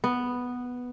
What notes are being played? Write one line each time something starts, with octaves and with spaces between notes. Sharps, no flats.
B3